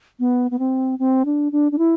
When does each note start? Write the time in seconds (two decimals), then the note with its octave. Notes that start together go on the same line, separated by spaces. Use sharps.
0.20 B3
0.51 B3
0.59 C4
0.99 C4
1.25 D4
1.52 D4
1.72 D4
1.78 E4